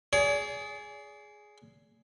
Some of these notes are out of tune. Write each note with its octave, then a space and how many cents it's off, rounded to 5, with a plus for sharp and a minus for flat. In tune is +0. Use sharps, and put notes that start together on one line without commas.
G#4 +5 D5 -35